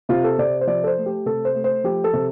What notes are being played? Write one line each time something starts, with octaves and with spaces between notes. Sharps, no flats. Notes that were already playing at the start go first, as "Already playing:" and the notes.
C3 F4
A4
C3 D5
C5
F3 D5
A4
C5
A3
G4
C3 A4
C5
A3
C5
F3 G4
A4
C3